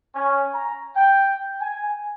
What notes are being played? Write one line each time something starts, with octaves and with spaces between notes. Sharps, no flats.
C#4
A#5
G5
G#5